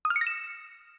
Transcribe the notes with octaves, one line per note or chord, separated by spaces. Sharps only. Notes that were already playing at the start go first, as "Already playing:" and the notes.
D#6
F6
C#7
A#6
E7